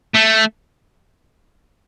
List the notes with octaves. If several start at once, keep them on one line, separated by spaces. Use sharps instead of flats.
A3